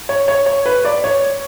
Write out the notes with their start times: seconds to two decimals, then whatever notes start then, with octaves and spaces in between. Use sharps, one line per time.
0.09 C#5
0.28 C#5
0.46 C#5
0.66 B4
0.85 D5
1.04 C#5